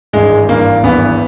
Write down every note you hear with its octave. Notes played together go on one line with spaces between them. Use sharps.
G#1 G2 E3 G#3
G#1 G2 E3 A#3
G#1 G2 E3 B3